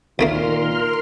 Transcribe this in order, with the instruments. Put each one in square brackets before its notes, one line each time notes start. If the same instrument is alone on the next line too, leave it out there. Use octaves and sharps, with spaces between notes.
[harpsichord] D2 A3 A#3 [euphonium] A#2 [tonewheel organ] D#3 [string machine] A#4 C6 F6